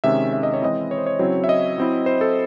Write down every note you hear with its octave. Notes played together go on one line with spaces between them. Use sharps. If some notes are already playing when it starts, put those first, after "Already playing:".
C3 D#3 G#3 C#4 E5
E5
D#5
C#5
E3 G#3 C4 E4 D#5
C#5
C5
C#5
C#3 F#3 C4 E4
E5
D#5
F#3 C4 E4
C5
A4